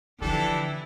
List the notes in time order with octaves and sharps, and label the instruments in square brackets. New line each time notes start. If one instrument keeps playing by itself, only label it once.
[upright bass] D3 F3 [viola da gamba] E3 E4 [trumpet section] D4 G4 A4